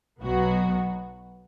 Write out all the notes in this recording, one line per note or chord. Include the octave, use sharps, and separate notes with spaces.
B1 B2 F#3 B3 F#4